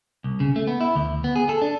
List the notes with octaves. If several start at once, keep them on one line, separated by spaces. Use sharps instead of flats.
C2
C#3
A3
B3
E4
D2
B3
G#4
A4
D4